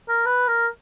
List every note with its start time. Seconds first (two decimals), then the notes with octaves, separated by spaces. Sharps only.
0.09 A#4
0.26 B4
0.48 A#4